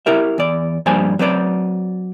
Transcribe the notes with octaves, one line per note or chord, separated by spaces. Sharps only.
E4 G4 A#4 E5
E2 D5
G2 F3 A#3 C5 D5 G#5
F#3 C4 B4 D5